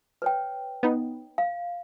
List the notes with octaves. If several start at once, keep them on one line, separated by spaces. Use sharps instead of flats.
B4 C#5 G5
B3 D#4
F5